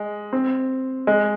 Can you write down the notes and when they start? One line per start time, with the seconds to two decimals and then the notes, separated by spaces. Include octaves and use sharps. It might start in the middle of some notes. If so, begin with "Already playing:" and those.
Already playing: G#3
0.33 C4
1.07 G#3